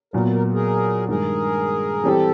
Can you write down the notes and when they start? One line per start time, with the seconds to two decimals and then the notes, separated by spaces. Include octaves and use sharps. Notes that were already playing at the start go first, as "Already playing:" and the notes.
0.13 A#2 F#3 B3 A#4
0.33 A#4
0.53 G#4 A#4
1.08 G2 D#3 G#3 G#4 A#4
2.03 E3 G3 C4 G4 A4